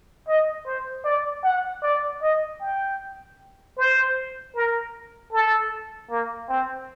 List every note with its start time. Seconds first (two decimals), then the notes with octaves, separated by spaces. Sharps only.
0.28 D#5
0.66 C5
1.05 D5
1.44 F#5
1.83 D5
2.22 D#5
2.61 G5
3.77 C5
4.55 A#4
5.32 A4
6.10 A#3
6.49 C4